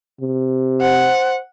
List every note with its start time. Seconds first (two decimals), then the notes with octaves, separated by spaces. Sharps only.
0.21 C3
0.81 C5 F#5